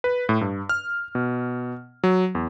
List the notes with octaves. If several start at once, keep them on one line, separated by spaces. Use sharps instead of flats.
B4
A2
G2
F6
B2
F#3
E2